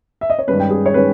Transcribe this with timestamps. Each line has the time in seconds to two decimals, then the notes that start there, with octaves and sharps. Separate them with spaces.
0.21 E5
0.30 D#5
0.39 C#5
0.47 G2 D#3 G#3 C#4 B4
0.60 G5
0.70 G#4
0.86 C#5
0.94 D#3 G#3 C#4 B4